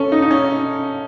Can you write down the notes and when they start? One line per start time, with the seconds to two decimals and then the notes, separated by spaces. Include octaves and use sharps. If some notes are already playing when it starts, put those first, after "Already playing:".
Already playing: C#4 A4
0.12 D#4
0.22 D#4
0.31 C#4